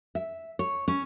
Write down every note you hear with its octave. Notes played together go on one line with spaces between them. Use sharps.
E5
C#5
C#4